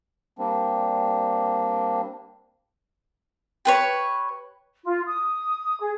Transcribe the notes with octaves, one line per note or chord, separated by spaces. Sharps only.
G3 A#3 C4 D4
G4 B4 C#5
F4
D#6
G#4